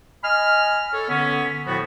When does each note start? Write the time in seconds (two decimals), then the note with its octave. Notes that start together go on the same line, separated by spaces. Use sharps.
0.24 D#5 G#5 B5 F6
0.94 A4 C#5
1.09 D3 B3 C#4
1.67 A2 D3 F3 A3 B3 F#4